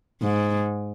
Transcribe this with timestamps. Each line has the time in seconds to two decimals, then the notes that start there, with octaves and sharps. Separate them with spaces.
0.23 G#2